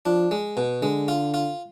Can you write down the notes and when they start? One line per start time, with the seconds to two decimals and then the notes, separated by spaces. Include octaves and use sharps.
0.05 F3 D4
0.31 G#3
0.57 B2
0.82 D3 G#3
1.08 F4
1.34 F4